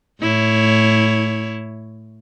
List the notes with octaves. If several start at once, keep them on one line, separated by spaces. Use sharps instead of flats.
A2 E4 C#5